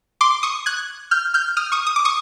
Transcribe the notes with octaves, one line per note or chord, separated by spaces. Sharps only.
C6 D6
C#6 D#6
F#6 G#6
F6 G6
F6 G6
D#6 F6
C#6 D#6
D#6
D6
C#6 D#6